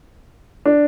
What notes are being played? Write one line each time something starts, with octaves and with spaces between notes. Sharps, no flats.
D4